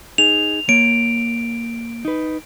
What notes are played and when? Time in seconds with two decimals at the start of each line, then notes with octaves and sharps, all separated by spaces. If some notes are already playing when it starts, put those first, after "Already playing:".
0.18 D#4 G#4 F7
0.69 A#3 C#5 D7
2.05 D#4 B4